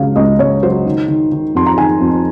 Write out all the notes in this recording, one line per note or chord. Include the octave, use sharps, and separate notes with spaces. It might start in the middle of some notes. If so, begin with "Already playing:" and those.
Already playing: C#2 C#3 F#3 F5
C#2 D#5
C#2 C#5
F#3 C5
D#3
D#3
D#3
F2 C6
A#5
D#3 G#5
F2